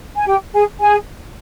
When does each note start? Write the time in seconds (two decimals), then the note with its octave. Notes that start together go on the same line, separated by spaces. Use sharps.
0.16 G#5
0.27 G4 G5
0.54 G#4 G#5
0.80 G#4 G#5